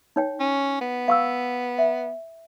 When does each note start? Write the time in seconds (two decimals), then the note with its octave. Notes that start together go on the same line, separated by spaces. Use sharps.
0.16 D#4 C#5 G5
0.40 C#4
0.81 B3
1.08 F5 C#6 E6
1.78 E5